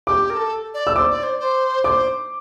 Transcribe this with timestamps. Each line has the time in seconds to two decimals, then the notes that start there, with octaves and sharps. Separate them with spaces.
0.07 G4 D6
0.30 A#4
0.35 A4
0.74 D5
0.87 E6
0.96 C5 D6
1.10 D5
1.23 C5
1.39 C5
1.84 C5 D5 D6